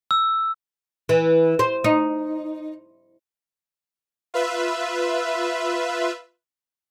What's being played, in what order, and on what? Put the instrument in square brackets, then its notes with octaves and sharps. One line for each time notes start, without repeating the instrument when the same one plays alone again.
[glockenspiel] E6
[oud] E3
C5
D#4
[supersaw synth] F4 B4 E5